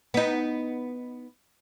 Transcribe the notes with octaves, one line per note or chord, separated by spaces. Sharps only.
B3 D#4